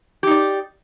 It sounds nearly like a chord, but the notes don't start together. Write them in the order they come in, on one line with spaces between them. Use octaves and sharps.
G4 D#4 D5